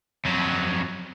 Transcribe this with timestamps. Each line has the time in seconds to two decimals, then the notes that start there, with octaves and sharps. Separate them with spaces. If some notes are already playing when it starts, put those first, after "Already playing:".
0.25 F2 F#3